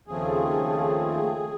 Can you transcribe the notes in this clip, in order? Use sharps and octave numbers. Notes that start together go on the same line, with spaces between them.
D#2 C#3 F3 A3 C4 G#4